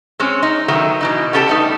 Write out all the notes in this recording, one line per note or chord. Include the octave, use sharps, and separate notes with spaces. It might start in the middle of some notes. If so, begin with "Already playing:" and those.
G#3 C4 C#4 C#5
D#4
D#3 F#3 A3 B3
B2 E3 D#4
B3 C#4 G4 A4 G5 A5
G3 A3 D#4